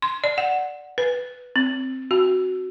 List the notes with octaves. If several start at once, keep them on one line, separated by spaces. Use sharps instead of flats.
C6
D5
F#5
B4
C4
F#4